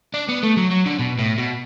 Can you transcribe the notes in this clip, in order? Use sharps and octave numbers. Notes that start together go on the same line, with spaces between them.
D4
B3
A3
F#3
F#3
D3
B2
A2
B2